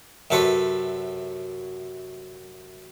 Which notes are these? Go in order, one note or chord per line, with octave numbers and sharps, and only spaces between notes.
F#2 C3 A4 B4 C#5 C6